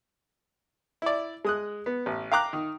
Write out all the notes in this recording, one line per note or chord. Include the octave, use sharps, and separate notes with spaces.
E4 D5
G#3 D#6 F#6
B3
A1
F5 G5 A#5 D6 F#6
D#3